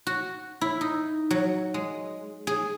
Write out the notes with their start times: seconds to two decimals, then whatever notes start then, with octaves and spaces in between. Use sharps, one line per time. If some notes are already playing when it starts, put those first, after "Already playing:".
0.07 F#4
0.61 E4
0.81 D#4
1.31 F#3
1.74 G#3
2.47 G#4